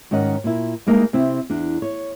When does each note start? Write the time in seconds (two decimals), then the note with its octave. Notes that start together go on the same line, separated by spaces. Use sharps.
0.11 G#2 D#3 C#4 D#5 F#5
0.44 A#2 E4
0.87 G3 G#3 A#3 D#4 E4
1.13 C3 C4 E4
1.50 E2 D4
1.82 C#5